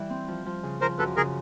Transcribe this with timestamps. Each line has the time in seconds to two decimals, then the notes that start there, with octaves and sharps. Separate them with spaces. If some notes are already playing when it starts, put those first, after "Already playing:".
Already playing: E3 G3
0.10 C4
0.28 F3
0.46 F3
0.63 C#3
0.81 F3 A#4 C5
0.99 F#2 A4 B4
1.16 C#3 G#4 A#4